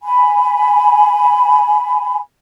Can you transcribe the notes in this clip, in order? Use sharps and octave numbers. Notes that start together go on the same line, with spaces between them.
G#5 B5